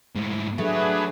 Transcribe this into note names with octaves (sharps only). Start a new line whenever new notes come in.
G#2 A3
F#3 A3 D4 G#4 B4